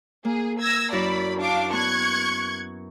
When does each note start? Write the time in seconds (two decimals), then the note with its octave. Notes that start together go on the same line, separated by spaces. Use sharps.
0.25 A#3 G#4
0.60 E6 G#6 A#6
0.92 F#2 E4 D5 B5 E6
1.39 D4 F5 D6
1.73 B3 C#6 F#6 G#6